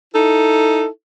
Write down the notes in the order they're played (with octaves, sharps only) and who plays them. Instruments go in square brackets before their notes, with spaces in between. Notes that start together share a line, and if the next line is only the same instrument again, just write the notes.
[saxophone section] D#4 E4 A4